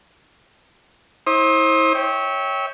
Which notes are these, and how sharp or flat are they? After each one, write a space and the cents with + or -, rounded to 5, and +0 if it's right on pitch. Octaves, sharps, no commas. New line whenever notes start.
E4 -35 C5 +35 D#6 -15
C#5 +0 E5 -30 G5 +0